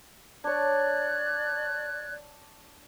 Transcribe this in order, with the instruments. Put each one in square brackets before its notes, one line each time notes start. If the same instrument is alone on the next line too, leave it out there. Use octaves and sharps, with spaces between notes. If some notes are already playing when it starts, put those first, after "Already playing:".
[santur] D4 C#5 [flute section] D5 F#6 G#6